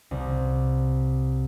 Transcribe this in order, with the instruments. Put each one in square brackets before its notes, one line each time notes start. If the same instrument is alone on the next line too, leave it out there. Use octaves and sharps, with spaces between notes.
[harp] C2